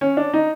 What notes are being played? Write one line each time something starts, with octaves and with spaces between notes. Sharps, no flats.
C#4
D4
D#4